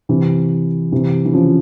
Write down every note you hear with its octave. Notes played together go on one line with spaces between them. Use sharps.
C3 E3
C3 E3
E3
C#3 F3